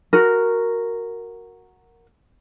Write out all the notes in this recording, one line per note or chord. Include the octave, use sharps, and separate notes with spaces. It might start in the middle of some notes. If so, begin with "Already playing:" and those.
F#4 A#4